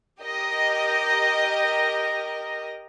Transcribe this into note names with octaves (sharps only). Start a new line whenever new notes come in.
G4 A#4 D#5